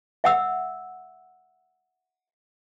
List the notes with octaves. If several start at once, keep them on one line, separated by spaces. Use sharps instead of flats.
E5 F#5 E6